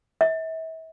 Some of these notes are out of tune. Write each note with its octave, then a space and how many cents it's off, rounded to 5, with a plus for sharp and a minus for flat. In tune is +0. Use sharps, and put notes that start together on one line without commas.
E5 -35